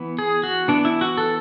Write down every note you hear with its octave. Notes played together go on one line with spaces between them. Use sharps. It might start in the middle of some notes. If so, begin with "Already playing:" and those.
Already playing: E3 B3
G#4
F#4
E3 B3 D4
E4
F#4
A4